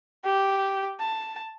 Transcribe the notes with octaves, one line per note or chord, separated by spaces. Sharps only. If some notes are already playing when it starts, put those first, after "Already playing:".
G4
A5